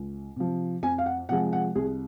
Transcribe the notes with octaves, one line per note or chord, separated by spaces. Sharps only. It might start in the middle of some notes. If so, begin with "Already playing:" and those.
Already playing: C#2
C3 F3
F2 G#5
F5
F#5
C3 F3 G#3 F#5
F#5
C2 G#4